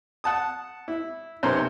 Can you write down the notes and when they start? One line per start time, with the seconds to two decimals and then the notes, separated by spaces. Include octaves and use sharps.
0.24 F#5 A5 D#6
0.88 E4
1.43 B1 C3 A#3 C#4 C5 A#5